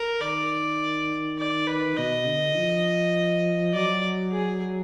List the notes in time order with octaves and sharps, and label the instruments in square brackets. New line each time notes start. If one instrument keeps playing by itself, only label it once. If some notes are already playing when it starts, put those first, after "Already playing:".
Already playing: [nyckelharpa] A#4
[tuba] D#3 [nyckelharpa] D5
[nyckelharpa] D5
B4
[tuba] B2 [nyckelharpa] D#5
[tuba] D3
F3
[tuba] F#3 [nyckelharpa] D5
[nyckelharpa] G#4